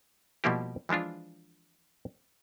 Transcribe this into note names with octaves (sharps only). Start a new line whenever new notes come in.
B2 F3 G3 A#3 E4 G4
E3 F3 G#3 D4 F4